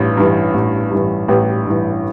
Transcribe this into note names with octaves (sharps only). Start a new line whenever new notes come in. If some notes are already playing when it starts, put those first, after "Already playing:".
Already playing: A1 G2 E3
G2 E3
A1
G2 E3
A1 G4 B4
G2 E3